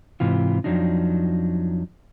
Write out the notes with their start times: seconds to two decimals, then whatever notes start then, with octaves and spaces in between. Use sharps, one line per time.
0.20 G#2 C3 E3 F4
0.64 F2 B2 F3 F#3 D4 D#4